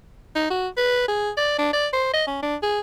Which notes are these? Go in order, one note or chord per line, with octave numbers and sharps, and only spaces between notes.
D#4
F#4
B4
G#4
D5
D4
D5
C5
D#5
C#4
D4
G#4